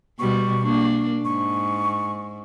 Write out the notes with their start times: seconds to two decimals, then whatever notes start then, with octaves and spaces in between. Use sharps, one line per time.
0.19 B2 G3 C#6
0.63 A#3 D4
1.25 G#2 C#6